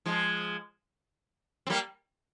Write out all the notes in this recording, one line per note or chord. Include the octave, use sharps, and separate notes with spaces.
F3 G#3
C4
G3 A#3